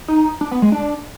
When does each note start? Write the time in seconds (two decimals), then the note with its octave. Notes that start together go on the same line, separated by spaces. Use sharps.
0.08 D#4
0.41 D4
0.51 B3
0.62 G#3
0.72 D4